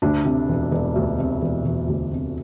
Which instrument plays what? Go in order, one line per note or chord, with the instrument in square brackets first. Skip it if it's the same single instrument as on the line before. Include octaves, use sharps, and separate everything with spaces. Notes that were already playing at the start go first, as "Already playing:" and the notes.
[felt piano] D2 D4
C3
E1
E1
D2
C3
E1
E1
D2
C3